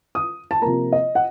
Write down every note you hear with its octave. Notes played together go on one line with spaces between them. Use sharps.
D#6
A5
C3 F3 A#3 A#5
D#5
F#5